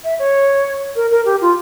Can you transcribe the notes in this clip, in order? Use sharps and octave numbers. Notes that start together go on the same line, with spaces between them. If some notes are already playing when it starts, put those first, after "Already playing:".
E5
C#5
A#4
A#4
G4
F4